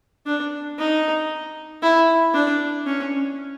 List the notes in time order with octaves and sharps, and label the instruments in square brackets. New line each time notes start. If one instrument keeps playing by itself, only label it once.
[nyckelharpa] D4
D#4
E4
D4
C#4